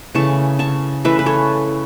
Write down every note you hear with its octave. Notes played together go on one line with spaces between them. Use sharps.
C#3 E3 A3 A5 C#6
A5 C#6
C#3 E3 A3 B4 E5
B4
A4 C#5